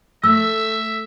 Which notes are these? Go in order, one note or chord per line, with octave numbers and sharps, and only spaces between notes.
A3 E5 E6